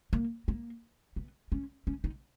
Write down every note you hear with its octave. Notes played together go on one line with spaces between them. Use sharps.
A#3
A#3
B3
C#4
C#4
D#4